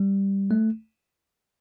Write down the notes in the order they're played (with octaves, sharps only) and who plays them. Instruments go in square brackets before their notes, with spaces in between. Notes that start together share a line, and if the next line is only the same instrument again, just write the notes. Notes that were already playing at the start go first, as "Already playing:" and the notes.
Already playing: [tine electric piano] G3
A3